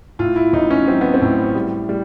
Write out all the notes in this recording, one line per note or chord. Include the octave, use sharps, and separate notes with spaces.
A2 F4
E4
A1 D#4
C#4
F#3 C4
B3
C4
A2
G3
G3